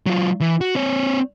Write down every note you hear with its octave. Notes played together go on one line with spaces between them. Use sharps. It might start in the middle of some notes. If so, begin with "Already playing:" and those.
F#3 F4
E3
F#4
C4 C#5